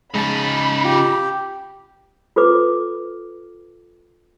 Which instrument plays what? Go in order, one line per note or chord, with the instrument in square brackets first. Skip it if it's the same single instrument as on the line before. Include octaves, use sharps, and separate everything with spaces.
[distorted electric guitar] C#3 D#4 [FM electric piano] G#3 A5 [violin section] B5
[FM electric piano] F4 [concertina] G4
[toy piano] F4 A4 B4 D6